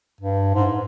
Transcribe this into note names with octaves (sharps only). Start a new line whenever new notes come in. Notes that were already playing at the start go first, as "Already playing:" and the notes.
G2
G#2